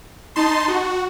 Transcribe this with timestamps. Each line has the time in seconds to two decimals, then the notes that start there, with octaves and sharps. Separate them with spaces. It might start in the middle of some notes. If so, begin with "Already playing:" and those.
0.36 D#4 A5 C6
0.68 F#4